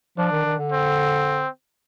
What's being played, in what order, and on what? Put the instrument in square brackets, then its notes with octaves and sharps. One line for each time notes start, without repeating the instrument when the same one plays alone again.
[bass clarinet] F3 [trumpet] D4
[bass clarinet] D#3
D#3
D3
[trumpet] C4